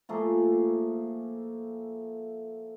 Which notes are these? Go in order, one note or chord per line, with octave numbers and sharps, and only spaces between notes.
F3 A3 A#3 G#4